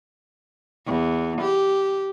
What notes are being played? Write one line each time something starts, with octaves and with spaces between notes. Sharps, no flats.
E2
G4